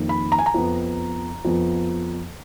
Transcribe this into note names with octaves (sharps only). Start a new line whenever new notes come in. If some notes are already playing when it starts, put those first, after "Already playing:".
Already playing: F2 D#3 A#3
B5
A#5
G#5
A#5
F2 F3 B3
F2 F3 B3